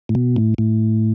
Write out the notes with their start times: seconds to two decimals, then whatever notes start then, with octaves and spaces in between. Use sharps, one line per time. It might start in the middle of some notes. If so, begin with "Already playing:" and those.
0.09 A2
0.15 B2
0.36 A2
0.58 A2